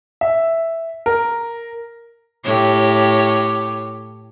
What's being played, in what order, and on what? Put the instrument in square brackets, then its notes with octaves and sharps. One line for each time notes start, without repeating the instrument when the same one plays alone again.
[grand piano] E5
A#4
[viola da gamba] A2 G4 C#5